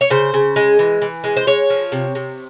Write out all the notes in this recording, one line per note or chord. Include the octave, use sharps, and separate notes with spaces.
C#5
C#3 C5
C#3
G#3
E3
E3
G#3
C5
G#3 C#5
F3
C3
C3